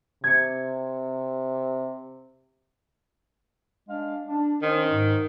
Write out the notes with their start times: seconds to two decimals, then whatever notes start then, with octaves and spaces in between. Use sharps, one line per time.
0.24 C3 G#6 C#7
3.89 G#3 D4 F5
4.28 D4
4.62 D#3 C#4 D#4 C5
4.89 G#2